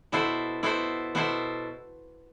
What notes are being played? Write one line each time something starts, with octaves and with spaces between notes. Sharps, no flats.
B2 B3 E4 A4 C5
B2 B3 E4 A4 C5
B2 B3 E4 A4 C5